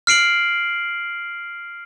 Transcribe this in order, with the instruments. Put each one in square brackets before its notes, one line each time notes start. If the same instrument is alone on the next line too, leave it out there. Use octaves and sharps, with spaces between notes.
[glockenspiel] F6 C7 D7 F#7